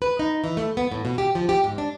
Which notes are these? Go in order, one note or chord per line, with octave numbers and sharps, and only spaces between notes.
B4
D#4
E3
A3
B3
A2
B2
G4
F3
G4
G#2
D4